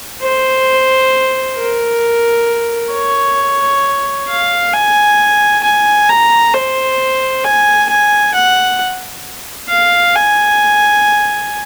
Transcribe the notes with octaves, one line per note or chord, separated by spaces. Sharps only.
C5
A#4
C#5
F5
G#5
G#5
A#5
C5
G#5
G#5
F#5
F5
G#5